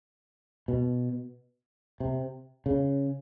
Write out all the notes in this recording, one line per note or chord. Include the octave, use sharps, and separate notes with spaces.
B2
C3
C#3